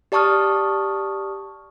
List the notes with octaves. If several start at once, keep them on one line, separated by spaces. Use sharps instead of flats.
G4 D5 A5 C#6 D#6 F6